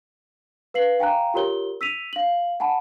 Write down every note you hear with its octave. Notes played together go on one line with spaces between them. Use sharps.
B4 F5 C7 F#7
F5 G5 G#5 A#5 F#6
F4 G4 A#4 C#5 G7
E6 B6 D#7 F7
F5 F#7
F#5 G#5 A5 B5